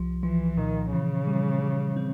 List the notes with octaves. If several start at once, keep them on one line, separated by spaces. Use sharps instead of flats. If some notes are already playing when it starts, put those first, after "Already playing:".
Already playing: C2 F3
E3 F3
A#2 D#3
C#3 E3
G3
G3
C4